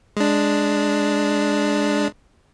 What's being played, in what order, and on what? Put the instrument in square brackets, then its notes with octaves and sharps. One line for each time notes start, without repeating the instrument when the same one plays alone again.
[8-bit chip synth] G#3 D4